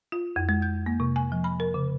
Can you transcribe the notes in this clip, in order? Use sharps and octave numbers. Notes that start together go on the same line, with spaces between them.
F4
F2
G#3
G6
A#3
C3
G#5
F3
B5
A#4
C#3